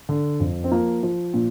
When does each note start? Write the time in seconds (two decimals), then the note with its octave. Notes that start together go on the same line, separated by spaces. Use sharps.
0.09 D3
0.40 F2
0.64 C4
0.72 F3 A#3
1.03 F3
1.34 A#2